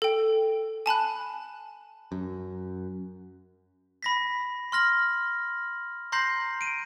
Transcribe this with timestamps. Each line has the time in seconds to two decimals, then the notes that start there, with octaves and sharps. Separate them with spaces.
0.02 A4 G5
0.86 G#5 A5 B5 F#6
2.12 F#2
4.03 B5 A#6 B6
4.72 C6 F6 A#6 F#7
6.12 A#5 C6 G6 A#6 C7 F#7
6.61 D7 D#7